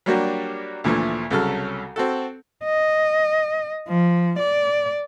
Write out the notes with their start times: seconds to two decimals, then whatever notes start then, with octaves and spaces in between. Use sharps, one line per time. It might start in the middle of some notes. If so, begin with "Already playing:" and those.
0.06 F#3 G3 A#3 D4 F#4 G4
0.84 D2 A#2 E3 F3 A3
1.31 C2 C#3 F#3 A4 C#6 F6
1.96 C4 F#4 A4
2.65 D#5
3.88 F3
4.39 D5